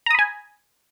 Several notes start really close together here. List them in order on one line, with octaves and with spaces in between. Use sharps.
A#5 D#6 B5 G#5